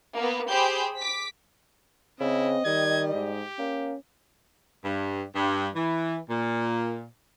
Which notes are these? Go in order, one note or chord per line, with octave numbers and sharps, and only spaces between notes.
A#3 B3
G4 G#4 C5 B5 G6
D6 B6
C#3 C4 E4 D#5
D#3 G3 G#6
G#2 G4
A#3 C#4
G2
G2
E3
A#2